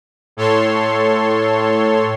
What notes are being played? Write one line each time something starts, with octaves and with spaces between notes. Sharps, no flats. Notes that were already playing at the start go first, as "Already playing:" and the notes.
A2 A4 C#5 C6